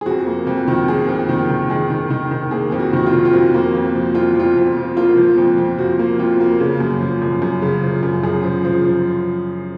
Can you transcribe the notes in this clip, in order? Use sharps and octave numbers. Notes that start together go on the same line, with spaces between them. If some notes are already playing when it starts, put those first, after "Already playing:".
G#4
F2 F#4
A#3
F2
D#3
A#3 G#4
F2
D#3
D#3
D#3 G#4
D#3
D#3
D#3
A#3 G#4
F2
F#4
D#3 F#4
F4
D#3
F4
F2 F#4
A#3
F2
F3
F2 F4
F2 F4
F2
F3
A#3 F4
F3
F2
F2
F3 F#4
A#3
F2 F4
A#3
C#3
F#2
F3
F#2
F#2
C#3
F3
F#2
F#2 G#4
F3
F3
F3